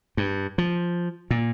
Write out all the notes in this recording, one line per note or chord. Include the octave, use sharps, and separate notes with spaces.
G2
F3
A#2